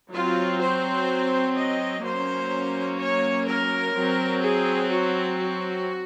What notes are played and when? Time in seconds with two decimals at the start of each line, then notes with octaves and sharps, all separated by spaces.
0.12 F#3 C4 F4
0.60 C5
1.56 D#5
2.03 F#3 A#3 C#4 C5
2.99 C#5
3.46 A#4
3.93 F#3 C4
4.41 G#4
4.90 F#4
5.36 F#4